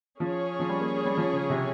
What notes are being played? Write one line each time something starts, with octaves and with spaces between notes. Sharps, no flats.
F3 C#4 G#4 C#5
F3
G3
A#3
G3
F3
C#3
C3